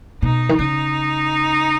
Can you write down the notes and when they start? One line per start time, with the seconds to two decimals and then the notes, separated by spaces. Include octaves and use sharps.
0.22 B2 D#4
0.49 D#3
0.58 C#3 D#4